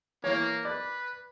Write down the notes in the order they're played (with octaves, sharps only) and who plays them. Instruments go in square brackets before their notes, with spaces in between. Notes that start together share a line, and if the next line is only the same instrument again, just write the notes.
[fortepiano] E3 C#5 [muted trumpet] A#3
[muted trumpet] B4 [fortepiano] D5